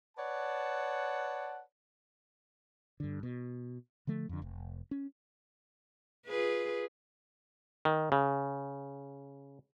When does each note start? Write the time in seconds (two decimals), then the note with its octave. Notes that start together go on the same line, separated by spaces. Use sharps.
0.17 B4 C#5 D5 F#5 A5
3.00 G2 D3
3.23 B2
4.07 D3 F3 A3
4.29 F2 D3
4.42 F1
4.91 C#4
6.27 F4 G#4 B4
7.85 D#3
8.12 C#3